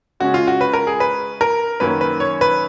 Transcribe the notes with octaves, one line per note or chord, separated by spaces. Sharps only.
C#3 G#3 C#4 F#4
F4
F#4
B4
A#4
G#4
B4
A#4
F#2 D#3 F#3 A#3 C#4 B4
B4
C#5
B4